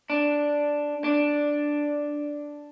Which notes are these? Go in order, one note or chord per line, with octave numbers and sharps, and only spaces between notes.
D4
D4